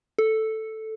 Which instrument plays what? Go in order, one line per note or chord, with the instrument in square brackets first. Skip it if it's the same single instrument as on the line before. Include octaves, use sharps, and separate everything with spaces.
[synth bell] A4